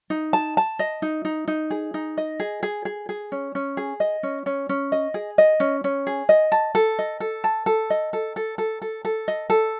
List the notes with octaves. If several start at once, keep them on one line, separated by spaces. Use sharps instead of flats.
D#4
A5
A5
D#5
D#4
D#4
D#4
G#4
D#4
D#5
G#4
G#4
G#4
G#4
C#4
C#4
G#4
D#5
C#4
C#4
C#4
D#5
G#4
D#5
C#4
C#4
G#4
D#5
A5
A4
D#5
A4
A5
A4
D#5
A4
A4
A4
A4
A4
D#5
A4